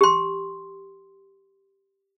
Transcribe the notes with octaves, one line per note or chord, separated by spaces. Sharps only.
G4 C6